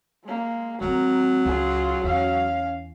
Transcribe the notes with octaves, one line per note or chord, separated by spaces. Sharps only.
G#3 A#3
F#3 G#3 C4 A#4
C#2 F4 G#4
E2 C#4 F5